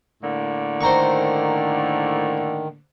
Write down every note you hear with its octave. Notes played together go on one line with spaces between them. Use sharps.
A2 D3 A#3
D#3 C5 A#5 C#6